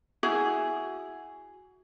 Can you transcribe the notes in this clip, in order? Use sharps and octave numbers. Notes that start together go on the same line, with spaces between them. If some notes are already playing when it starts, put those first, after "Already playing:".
E4 F#4 G#4